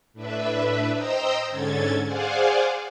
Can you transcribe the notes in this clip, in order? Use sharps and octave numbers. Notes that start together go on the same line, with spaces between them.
A2 D4 B4 E5
C5 D#5 G5 A#5 D#6 E6
G#2 D3 C#4 A4 G#6 A6
G#4 C5 D5 F5 F#5 G#5